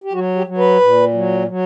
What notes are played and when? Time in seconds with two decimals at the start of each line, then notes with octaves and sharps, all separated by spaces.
0.04 G4
0.13 F#3 F#4
0.36 G4
0.47 F#3
0.58 B4
0.81 A#2
1.13 F#3
1.47 F#3